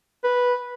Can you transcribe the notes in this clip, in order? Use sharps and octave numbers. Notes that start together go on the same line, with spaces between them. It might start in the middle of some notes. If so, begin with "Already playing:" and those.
B4